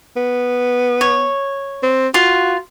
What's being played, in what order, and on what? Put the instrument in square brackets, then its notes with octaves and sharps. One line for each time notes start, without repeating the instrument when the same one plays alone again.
[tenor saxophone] B3
[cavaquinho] C#5
[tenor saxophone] C4
[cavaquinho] F4 [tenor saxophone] F#4